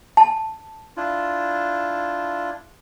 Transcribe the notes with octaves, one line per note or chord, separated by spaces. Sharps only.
A5
D4 E4 F4